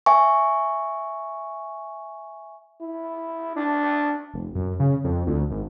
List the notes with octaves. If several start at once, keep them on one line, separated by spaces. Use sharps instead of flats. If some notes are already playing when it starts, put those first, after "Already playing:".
E5 G#5 C#6
E4
D4
F1
F#2
C#3
F2
D2
G#1